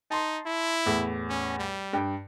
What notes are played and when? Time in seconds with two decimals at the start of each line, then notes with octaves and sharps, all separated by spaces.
0.11 D#4 A5 C6
0.46 E4
0.86 E2 A2
1.29 C#4
1.59 G3
1.93 G2 G5